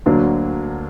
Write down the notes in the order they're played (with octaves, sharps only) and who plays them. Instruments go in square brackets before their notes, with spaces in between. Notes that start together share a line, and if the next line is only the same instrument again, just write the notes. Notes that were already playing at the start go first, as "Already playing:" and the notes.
[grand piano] D2 D3 F#3 A#3 D4